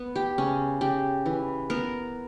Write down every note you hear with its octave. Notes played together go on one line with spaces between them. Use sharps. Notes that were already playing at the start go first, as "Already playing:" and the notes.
Already playing: B3
G4
C#3 C#4
C#3 G4
E3
B3 A#4